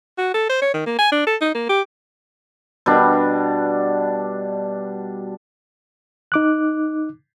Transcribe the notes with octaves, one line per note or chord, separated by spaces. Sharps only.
F#4
A4
C5
C#5
D#3
A#3
G#5
D4
A4
D#4
A#3
G4
B2 G3 D4
D#4 D6 F#6